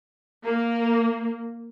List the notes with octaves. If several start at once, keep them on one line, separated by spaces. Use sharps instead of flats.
A#3